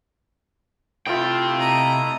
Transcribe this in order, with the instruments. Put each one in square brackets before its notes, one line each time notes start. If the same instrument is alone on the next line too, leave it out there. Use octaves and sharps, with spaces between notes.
[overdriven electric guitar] C3 G5 [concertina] A3 E4 [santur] F4 D#6
[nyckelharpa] D#5 A#5